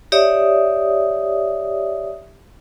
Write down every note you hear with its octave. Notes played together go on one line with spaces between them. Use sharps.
G4 C#5 D5 E5 D#6